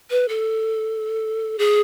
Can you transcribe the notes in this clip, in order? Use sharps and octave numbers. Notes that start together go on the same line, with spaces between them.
B4
A4
G#4